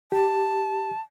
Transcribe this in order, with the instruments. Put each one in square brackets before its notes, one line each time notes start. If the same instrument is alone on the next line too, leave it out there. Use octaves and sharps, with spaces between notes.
[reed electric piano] G4 [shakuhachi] A5